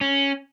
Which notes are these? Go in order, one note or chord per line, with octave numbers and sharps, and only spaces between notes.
C#4